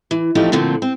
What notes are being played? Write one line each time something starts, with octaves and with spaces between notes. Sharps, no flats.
E3
E3 F3 A3 C4 D#4 G4
A#2 D3 F3 A3 C4
C4